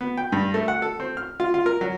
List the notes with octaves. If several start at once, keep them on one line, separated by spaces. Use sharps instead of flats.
B3
G5
G2
A3
F#5
A4
C4
F6
F4
F4
A#4
F#3